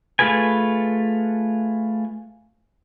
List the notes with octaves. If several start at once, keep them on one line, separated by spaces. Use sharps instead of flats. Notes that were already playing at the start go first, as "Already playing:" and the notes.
A3 F4 G#4 B4 G#5